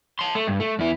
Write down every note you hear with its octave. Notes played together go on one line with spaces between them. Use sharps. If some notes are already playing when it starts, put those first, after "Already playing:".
A5 C6
A3
G2
A3
E2 E4